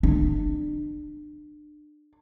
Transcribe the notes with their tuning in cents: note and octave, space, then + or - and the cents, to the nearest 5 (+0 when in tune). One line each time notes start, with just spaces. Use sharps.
D4 +30